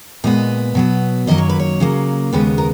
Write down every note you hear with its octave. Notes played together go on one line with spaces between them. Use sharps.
A#2 G#3 B3 D#5
B2 F#3 B3
F#2 D#3 F#3 A#3 D#5
C#5
B4
C#5
C#3 F#3 A#3
D#2 C#3 G#3 B3 B4
A#4